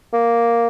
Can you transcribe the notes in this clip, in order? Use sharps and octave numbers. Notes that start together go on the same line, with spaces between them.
A#3